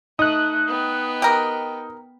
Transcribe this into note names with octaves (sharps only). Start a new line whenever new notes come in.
A3 D#4 D#6 F#6
B3 G5
G4 A#4